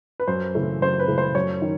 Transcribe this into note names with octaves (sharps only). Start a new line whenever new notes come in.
B4
F#2 C5
C#3 E3 A3
F#2 C5
B4
C#3 E3 A3
C5
F#2 C#5
D#3